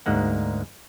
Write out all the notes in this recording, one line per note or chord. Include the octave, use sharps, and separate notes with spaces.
D2 G#2 G#3 A#3 F#5